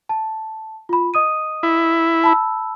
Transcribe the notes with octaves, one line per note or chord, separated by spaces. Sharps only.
A5
F4 B5
D#5 D#6 D#7
E4
A5 B5 E6